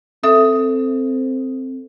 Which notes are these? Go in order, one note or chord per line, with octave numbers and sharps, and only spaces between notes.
C4 A4 E5 D#6